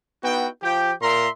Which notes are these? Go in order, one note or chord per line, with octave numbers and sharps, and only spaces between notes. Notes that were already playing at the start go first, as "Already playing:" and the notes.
B3 D#4 E4 F#4 G5
F3 G4 G5
A#2 A#4 E5 A#5 C6